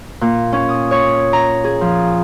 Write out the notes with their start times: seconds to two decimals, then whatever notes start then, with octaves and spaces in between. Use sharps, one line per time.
0.21 A#2
0.53 C#4
0.69 D#6
0.91 C#5
1.33 A#5
1.64 G#4
1.81 F3